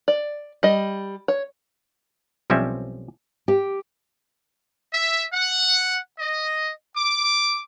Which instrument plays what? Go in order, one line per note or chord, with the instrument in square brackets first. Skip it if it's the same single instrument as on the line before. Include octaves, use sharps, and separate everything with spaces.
[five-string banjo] D5
G3 D#5
C#5
[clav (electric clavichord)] B1 F3 G3 C4 C#4 E5
[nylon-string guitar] G4
[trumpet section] E5
F#5
D#5
D6